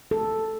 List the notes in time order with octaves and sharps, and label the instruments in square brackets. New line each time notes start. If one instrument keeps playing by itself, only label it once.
[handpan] A4